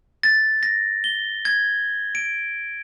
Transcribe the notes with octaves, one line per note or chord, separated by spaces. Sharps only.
A6
A#6
G7
G#6
D7